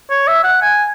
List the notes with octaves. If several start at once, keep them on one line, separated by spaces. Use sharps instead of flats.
C#5
E5
F#5
G#5